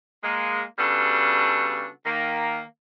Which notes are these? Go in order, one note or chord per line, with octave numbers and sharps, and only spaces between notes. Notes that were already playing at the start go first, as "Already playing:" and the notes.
G#3 A#3
C#3 G3 B3 D4 F#4 A4
D#3 A#3